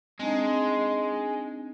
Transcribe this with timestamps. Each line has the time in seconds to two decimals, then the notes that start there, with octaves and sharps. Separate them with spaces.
0.20 G#3 C4 D4 D#4